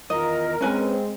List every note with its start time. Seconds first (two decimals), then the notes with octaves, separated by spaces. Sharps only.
0.10 E2 D#3 F4 A#4 D#5
0.61 G#3 C4 C#4 B4 G#5